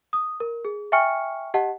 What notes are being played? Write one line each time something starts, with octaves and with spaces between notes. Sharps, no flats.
D#6
A#4
G#4
E5 G5 G#5 C#6 F6 C#7
G4 D#5 F#5 A5